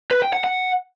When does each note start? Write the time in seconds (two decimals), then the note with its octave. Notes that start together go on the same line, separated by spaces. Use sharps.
0.11 B4
0.22 G5
0.33 F#5
0.44 F#5